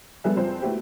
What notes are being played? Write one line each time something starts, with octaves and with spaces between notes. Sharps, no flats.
G3 G#3 B3 G#4 A4 E5
F#1 F3 C4 C5
A3 B3 E4 F#4 G4